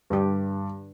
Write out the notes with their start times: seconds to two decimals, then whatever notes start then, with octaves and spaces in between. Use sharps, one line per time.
0.10 G2 D3 G3 D4 G4